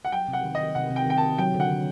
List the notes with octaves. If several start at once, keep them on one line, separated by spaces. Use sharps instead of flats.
F#5
F#3 G5
C3
F#5
D#3
D#3 D#5
C3 F#5
C3
G5
D#3 G5
D#3 A5
F#3 G5
D3
F#5
D3